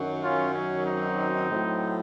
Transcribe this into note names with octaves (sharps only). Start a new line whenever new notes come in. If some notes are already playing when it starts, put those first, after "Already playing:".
Already playing: F#2 D#3 F#3
C#4 F4
C#4
C4 D#4
A2 F#3